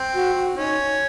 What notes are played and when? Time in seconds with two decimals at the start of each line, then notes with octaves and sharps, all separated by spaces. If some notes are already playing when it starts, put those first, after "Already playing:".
Already playing: C4
0.14 F#4
0.35 F#4
0.57 C#4 D#4